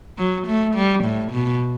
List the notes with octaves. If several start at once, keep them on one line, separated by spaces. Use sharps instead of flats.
F#3
A3
G3
A2
B2